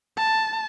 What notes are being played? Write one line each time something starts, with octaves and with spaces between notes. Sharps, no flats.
A5